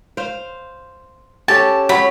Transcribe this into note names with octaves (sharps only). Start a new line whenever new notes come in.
C5 F5
C#4 G4 A4 A5
F#3 C#4 B5